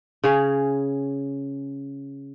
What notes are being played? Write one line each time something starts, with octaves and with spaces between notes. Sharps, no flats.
C#3 G#4 C#5